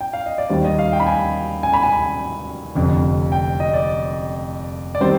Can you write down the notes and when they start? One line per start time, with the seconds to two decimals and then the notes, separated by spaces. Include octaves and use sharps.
0.01 G5
0.13 F5
0.26 D#5
0.38 D5
0.50 D#2 D#3 G3 C5
0.65 D#5
0.79 F5
0.93 G5
1.00 B5
1.07 G#5
1.63 G#5
1.73 B5
1.83 G#5
2.75 F1 F2 D3
3.32 G5
3.60 D#5
3.74 D5
4.95 D5
5.00 D#3 G3 C4 C5